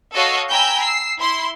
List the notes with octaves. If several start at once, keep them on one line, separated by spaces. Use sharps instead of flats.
F#4 A4 C#5 D#5 F5
G5 G#5 A#5 B5 E6 G6
E6 C7
E4 C6